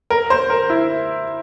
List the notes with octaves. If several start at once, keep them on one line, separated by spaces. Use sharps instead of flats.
A#4
C5
A#4
E4